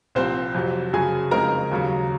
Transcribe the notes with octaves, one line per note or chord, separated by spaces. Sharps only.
C2 A#2 F3 C4 C5
F2 C3 F#3
F#2 C#3 F#3 G#4 G#5
F2 C#3 G#3 C4 D#4 A#4 A#5
D#2 C#3 F#3